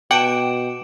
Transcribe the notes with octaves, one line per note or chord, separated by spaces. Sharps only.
B2 F#5 G5 D6 D7 E7